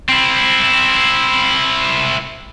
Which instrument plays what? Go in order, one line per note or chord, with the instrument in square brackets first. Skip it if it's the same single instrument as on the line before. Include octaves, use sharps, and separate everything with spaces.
[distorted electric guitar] C4 E4